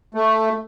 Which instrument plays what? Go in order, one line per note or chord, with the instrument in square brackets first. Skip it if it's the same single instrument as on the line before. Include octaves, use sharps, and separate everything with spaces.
[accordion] A3